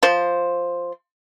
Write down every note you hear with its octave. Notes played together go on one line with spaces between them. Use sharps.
F3 C5